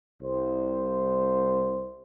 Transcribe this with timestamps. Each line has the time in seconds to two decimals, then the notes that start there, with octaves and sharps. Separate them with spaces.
0.21 C2 C5